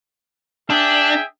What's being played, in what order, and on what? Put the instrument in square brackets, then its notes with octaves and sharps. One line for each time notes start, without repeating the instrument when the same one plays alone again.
[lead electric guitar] D4 [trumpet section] G#4 E5 G5